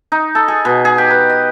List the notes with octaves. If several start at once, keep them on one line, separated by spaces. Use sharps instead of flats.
D#4
A4
G#4
B2
G#4
G4
B4
D#5